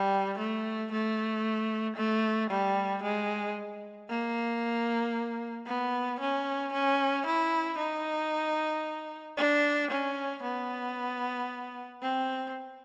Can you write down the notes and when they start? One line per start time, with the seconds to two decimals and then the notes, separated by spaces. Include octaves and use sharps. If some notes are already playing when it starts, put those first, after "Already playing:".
Already playing: G3
0.38 A3
0.92 A3
1.97 A3
2.51 G3
3.03 G#3
4.09 A#3
5.67 B3
6.20 C#4
6.73 C#4
7.26 E4
7.78 D#4
9.37 D4
9.91 C#4
10.43 B3
12.02 C4